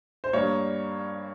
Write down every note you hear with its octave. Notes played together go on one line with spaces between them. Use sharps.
C5
G2 G3 A#3 C#5